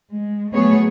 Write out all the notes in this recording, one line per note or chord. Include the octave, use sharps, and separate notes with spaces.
G#3
F#3 A3 B3 G#4 C#5